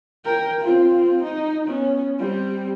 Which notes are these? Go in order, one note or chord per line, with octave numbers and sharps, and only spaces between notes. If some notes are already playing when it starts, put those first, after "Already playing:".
A#4 G5
C4 F4
D#4
B3 C#4
G3 C4